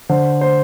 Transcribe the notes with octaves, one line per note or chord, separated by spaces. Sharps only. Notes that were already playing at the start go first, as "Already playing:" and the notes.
D3 C5
C5